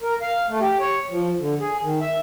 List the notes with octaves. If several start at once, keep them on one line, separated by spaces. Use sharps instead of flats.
A#4
F5
A3
G4
C#5
F3
D3
G#4
D#3
E5